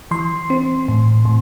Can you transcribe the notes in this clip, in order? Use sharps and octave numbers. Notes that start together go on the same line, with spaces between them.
E3 C6
C4
A2
A2